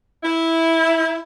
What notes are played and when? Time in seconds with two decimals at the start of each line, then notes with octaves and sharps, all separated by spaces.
0.24 E4